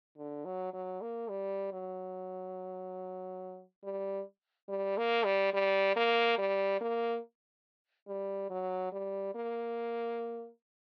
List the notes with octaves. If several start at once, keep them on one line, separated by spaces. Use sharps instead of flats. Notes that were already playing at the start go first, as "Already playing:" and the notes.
D3
F#3
F#3
A#3
G3
F#3
G3
G3
A#3
G3
G3
A#3
G3
A#3
G3
F#3
G3
A#3